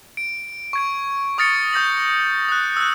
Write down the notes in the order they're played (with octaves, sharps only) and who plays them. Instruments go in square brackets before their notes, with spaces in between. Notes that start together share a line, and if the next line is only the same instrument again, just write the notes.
[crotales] D7
C#6 G#6 D7
C#6 D#6 F6 A6 A#6 C#7
D#6 G6 A#6 F#7
D#6 F#6
E6 F#6